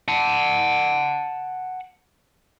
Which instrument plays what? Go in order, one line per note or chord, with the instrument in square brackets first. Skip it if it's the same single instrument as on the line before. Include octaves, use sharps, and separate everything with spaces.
[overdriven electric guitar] F#5 A5